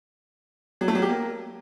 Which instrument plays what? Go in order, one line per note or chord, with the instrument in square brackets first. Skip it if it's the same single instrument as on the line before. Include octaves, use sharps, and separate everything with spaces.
[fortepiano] F#3
A3
F#3
G4
A#3